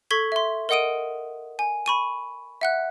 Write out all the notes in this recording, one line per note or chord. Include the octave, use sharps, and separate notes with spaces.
A4 C#6 G#6 B6 G7
E5 C6
A#4 D#5 F#5 D#6 D7 D#7
G#5
B5 C#6 D#7
E5 F#5 F#6